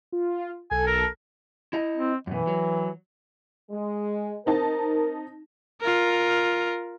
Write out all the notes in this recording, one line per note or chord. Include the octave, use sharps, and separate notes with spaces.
F4
B1 A4 G#5
A#4
E4 D#5
C4
F#2 B2 E3
F#3
G#3
C4 D#4 A#4 A5
F4 A#4